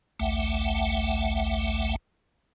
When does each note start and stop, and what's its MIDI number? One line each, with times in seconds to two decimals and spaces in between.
0.20 1.96 33
0.20 1.96 38
0.20 1.96 57
0.20 1.96 76
0.20 1.96 78
0.20 1.96 79